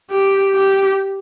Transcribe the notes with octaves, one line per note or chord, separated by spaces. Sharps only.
G4
G4